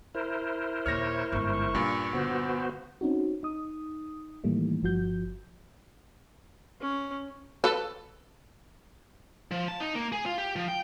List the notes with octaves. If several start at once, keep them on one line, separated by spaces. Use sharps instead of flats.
E4 A#4 C5
D#2 A#2 G4 C#5 F6 A#6
G1 G#2 C#6
G2 A#2 C#4
D3 B3 F#4 C5
C4 C#4 D#4 F#4
D#4 D#6
A2 D#3 E3 G3 A3 A#3
G1 F3 F#4 G6
C#4
A4 B4
F3
A5
D#4
A#3
G#4
F4
G4
F3
G5